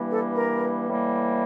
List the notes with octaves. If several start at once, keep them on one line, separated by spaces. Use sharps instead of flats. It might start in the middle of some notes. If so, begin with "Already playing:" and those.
Already playing: G2 E3 G3 A#3
A4
A#4
A2 E3 G3 A#3